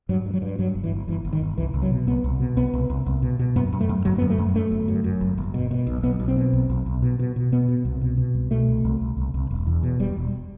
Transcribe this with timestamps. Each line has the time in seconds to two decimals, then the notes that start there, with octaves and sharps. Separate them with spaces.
0.09 G2 F#3
0.26 G2
0.33 F#3
0.42 G2
0.59 G2 F#3
0.75 G1
0.84 E3
0.92 G1
1.08 G1 E3
1.25 G1
1.33 D#3
1.41 G1
1.58 C2 E3
1.74 C2
1.82 F#3
1.90 B2
2.07 C2 B3
2.24 C2
2.40 B2
2.56 C2 B3
2.74 C2
2.90 C2
3.06 C2
3.22 B2
3.39 B2
3.56 F#2 B3
3.73 F#2
3.81 A3
3.89 F#2
4.05 G1 F#3
4.18 F#2 B3
4.30 A3
4.38 F#2
4.55 F#2 A3
4.71 G1
4.88 F#2
5.04 F#2
5.21 G1
5.38 G1
5.54 B2
5.71 B2
5.87 B1
6.03 B1 B3
6.20 B1
6.28 C4
6.36 B2
6.53 B1
6.69 B1
6.86 B1
7.02 B2
7.19 B2
7.36 B2
7.52 B2 B3
7.68 B2
7.85 C2
8.01 B2
8.18 B2
8.34 C2
8.51 B2 A3
8.68 C2
8.85 C2
9.01 C2
9.17 C2
9.34 C2
9.51 E1
9.67 E2
9.83 B2
9.99 E1 G3
10.17 E1